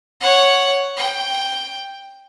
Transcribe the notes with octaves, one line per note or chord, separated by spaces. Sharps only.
C#5 F#5
G5